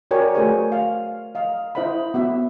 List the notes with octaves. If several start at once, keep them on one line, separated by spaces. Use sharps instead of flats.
F#4 A#4 C#5 D5 G5 G#5
A3 F#4 G#4 A#4 C5 G#5
F5
D#5 F5
E4 C5 D#5 F#5 B5
B3 F#4 E5